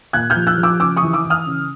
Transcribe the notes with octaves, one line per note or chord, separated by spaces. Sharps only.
A#2 F#6 G#6
F6 G6
F3
E6 F#6
F3
D6 E6
C#3 D6 E6
C#6 D#6
E3
D6 E6
E3
D#6 F6
C#3